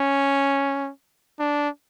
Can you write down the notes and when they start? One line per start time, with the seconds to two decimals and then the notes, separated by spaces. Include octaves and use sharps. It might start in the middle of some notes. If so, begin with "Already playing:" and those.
Already playing: C#4
1.40 D4